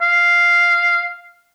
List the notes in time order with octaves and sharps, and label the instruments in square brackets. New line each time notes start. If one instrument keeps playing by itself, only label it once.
[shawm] F5